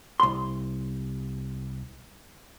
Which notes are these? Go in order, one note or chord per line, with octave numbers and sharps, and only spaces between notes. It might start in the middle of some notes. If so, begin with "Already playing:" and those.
C2 C6